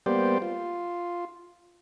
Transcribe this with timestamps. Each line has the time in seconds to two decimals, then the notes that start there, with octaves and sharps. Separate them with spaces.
0.06 G3 A#3 B3 G4 C5 D5
0.42 F4